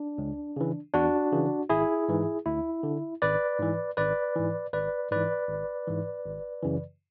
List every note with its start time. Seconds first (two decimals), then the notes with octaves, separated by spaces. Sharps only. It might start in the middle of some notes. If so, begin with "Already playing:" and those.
Already playing: D4
0.18 C#2
0.56 C#3 E3
0.94 E2 D4 F#4
1.32 C#3 E3
1.69 G#1 E4 G#4
2.09 G#2 E3
2.46 D2 E4
2.83 D3
3.21 G#1 B4 D5
3.59 G#2 E3
3.97 G#1 B4 D5
4.36 G#2 E3
4.73 G#1 B4 D5
5.11 G#2 E3 B4 D5
5.49 G#1
5.87 G#2 E3
6.25 G#1
6.63 F#2 C#3 E3